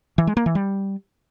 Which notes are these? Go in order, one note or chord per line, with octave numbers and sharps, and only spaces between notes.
E3
G#3
A#3
E3
G3